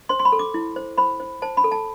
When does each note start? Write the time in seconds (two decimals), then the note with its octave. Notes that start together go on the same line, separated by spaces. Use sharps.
0.09 C5 C6
0.19 C6
0.25 B5
0.32 A4
0.39 D6
0.54 E4
0.76 C5
0.97 C5 B5
1.20 C5
1.42 C5 A5
1.57 B5
1.64 A4
1.72 A5